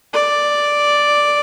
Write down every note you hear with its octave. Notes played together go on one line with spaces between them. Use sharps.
D5